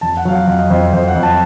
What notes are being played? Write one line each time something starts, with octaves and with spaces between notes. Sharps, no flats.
F2 A5
F#5
F#3 F5
F#5
F2 F5
D#5
F2 C5
F2 C5
F#5
F2
A5